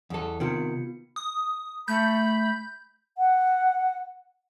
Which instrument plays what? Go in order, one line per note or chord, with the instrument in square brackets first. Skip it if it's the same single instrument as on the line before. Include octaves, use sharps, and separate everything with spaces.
[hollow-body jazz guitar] E2 A4
[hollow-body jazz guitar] C3 D#3 [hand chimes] B3 F4 C#7
[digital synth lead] D#6
[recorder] A3 [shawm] B5 [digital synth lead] G6
[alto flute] F#5